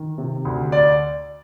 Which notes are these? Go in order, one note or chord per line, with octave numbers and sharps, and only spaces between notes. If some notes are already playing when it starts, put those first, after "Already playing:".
Already playing: D#3
C3
D2
D5